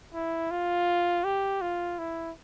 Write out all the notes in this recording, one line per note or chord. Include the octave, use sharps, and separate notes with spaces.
E4
F4
G4
F4
E4